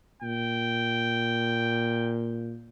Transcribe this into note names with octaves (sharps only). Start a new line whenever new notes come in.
A#2 G5